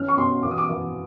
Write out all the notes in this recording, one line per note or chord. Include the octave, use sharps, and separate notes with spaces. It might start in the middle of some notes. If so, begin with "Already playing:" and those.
Already playing: E3 C#4 F6
C#6
B2 C6
E3 D6
D#6
D6
E3